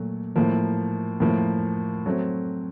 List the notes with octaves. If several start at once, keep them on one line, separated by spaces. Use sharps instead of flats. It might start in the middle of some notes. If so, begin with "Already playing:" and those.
Already playing: A#2 F#3 A3
A2 F3 A#3
A2 F3 A#3
F#3 A3 C4